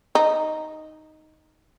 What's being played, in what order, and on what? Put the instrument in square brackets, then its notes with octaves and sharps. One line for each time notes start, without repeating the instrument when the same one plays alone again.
[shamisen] D#4